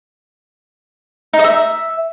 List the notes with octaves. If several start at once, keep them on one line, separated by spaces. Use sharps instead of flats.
D#4
D#5
E5